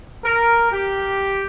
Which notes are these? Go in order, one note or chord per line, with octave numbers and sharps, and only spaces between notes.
A#4
G4